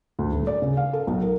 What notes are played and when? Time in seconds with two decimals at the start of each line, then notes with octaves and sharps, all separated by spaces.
0.19 D2
0.32 D#1
0.47 D5
0.62 C#3
0.77 F5
0.93 A4
1.07 B1
1.21 A#4